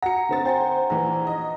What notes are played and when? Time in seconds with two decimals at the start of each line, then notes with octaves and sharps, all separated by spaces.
0.02 F#4 F#5 A#5 A#6 C#7
0.29 D3 C4 A6
0.45 C5 G5 G#5 A#5
0.90 A#1 E3 A#5
1.27 D#5